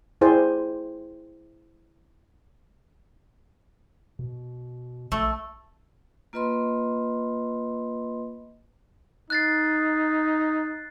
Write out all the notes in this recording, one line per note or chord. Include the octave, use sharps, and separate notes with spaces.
E4 G#4 C5 D5 G5 G#5
B2
A#1 A3
A#3 F4 B4 D#5 B5 C6
D#4 F#6 A6 C7